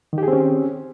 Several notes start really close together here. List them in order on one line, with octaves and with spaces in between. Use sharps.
D#3 G4 G#4 C4 C#4